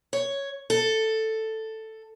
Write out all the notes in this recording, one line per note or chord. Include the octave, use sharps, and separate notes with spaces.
C#5
A4